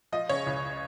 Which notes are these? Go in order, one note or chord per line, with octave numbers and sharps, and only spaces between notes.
F3 D#5
C#3 C#5
C#2